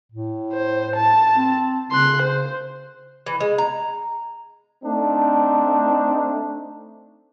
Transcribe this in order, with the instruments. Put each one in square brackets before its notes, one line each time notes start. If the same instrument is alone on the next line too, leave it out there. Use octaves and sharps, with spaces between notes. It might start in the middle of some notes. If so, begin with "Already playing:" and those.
[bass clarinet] A2
[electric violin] C5
A5
[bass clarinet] C4
[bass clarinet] C#3 [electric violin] C6 F#6
[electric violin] C5
[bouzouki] E3
G#3
A#5
[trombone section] A3 C4 D4 D#4